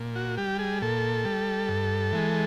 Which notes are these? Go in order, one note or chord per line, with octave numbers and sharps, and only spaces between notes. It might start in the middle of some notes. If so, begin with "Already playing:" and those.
Already playing: A#2
F#4
G3 G4
G#4
A#2 A4
G3
G2
E3 G#3